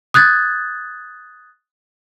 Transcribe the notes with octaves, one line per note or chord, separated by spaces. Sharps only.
D#6 F#6 G#6 A6